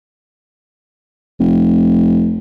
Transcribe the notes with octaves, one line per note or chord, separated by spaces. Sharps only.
F1